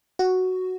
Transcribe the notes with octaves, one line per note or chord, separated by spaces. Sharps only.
F#4